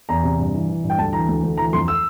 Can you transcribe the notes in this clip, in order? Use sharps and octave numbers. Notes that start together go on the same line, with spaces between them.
E2 A#5
C3
G2
E3
E3
G2
G5
D2 A5
E3 A#5
D2
D2
E3 A#5
F2 C6
E6